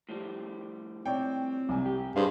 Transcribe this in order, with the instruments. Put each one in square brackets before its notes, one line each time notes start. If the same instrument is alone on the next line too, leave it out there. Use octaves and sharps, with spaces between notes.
[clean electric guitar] A2 F3 G3
[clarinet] C4 [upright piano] C#5 D5 G5
[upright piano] C2 G#5
[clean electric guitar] G4
[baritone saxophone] G2 [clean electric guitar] E4 C5 [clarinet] G#4 [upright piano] F5